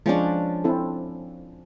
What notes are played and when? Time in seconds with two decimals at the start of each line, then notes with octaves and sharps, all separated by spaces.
0.06 F3 G#3 C#4 D4
0.64 C4 E4 A4